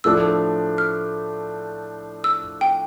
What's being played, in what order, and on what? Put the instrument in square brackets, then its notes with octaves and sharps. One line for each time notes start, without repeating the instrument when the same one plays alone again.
[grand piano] A2 F3 A3 D4 [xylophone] E6
[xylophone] F6
E6
G5